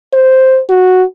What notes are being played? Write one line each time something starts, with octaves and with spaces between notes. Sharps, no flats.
C5
F#4